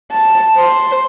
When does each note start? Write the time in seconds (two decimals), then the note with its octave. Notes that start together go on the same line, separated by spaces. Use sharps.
0.12 A5
0.57 C5